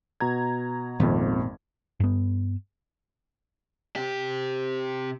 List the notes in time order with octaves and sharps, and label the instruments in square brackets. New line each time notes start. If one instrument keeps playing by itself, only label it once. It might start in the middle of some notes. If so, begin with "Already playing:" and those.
[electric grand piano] B2 A#5 G#6
[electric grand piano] G#1 F2 [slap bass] A#2 D#3 B3
[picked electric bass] G2 B3
[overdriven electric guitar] C3 G4